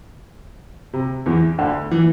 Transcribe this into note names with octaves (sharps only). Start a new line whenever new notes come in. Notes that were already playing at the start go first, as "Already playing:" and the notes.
C3
E2 E3
D2 D3
E3